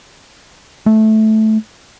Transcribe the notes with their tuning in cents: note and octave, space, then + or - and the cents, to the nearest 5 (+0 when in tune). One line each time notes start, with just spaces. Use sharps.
A3 -10